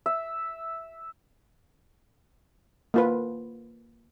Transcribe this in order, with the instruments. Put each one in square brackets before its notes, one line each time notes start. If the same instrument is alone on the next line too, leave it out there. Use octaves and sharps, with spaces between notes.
[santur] E5
[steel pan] A#3 F4 B4